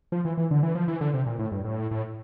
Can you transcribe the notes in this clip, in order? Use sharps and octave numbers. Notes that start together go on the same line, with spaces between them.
F3
E3
E3
D3
E3
F3
E3
D3
C3
A#2
A2
G2
A2
A2